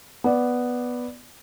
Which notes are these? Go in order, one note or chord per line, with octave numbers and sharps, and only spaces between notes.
B3 D5